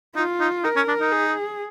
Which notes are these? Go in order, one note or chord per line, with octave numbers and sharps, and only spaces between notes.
D#4 F4
D#4
D#4 A#4
C#4
D4
D#4
G#4